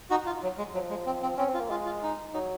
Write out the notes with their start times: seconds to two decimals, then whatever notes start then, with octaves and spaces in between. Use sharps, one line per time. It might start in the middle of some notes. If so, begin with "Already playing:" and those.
0.10 D#4 F#4
0.26 F4
0.43 F#3
0.58 G#3
0.74 F3 F#3
0.90 G#3
1.06 C4
1.22 C4
1.37 C4 C#4
1.49 C4
1.54 F4
1.59 A#3
1.70 G#3 F4
1.86 F4
2.03 D#4
2.34 F#3 D#4